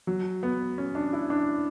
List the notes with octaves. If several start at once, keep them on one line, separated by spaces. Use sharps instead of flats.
F#3
B3
C#4
D4
E4
D4